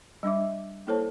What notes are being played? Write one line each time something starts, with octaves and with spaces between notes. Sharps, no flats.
G3 D4 E5 D6
A#3 E4 A4 C5 C#5 A5